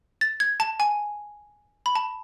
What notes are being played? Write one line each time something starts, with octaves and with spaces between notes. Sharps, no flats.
A6
G#6
A5
G#5
B5
A5